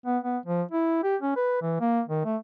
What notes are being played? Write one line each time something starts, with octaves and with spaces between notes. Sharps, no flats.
B3
B3
F3
E4
G4
C#4
B4
E3
A#3
D#3
A3